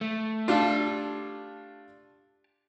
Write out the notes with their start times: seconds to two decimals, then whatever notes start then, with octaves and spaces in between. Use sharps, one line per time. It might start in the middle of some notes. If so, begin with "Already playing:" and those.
0.01 A3
0.48 A3 D4 F4 G4 A5